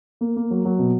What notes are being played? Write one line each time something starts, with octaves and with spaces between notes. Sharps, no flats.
A#3
A#3
F#3
F#3
B2